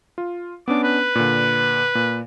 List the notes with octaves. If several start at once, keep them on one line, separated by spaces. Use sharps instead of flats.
F4
B3 C#4 D4 D6
B4
A#2 D3
A#2